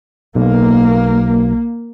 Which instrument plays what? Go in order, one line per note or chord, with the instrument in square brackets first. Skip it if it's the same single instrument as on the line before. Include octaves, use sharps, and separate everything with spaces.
[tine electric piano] B1 [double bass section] A#3